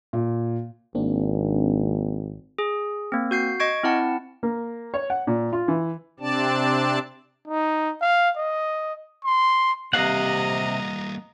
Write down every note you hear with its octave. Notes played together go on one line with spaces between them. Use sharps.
A#2
G#1 A#3 C4 D4
G#4
A#3 C4
F#4 G6 C7
D#5 C#6 G#6 D7
C4 E4 F#5 A5
A#3
C#5
F#5
A#2
F4
E3
C3 C4 D4 D5 A5
D#4
F5
D#5
C6
C3 G3 A#3 D#5 F5 F#5 A#5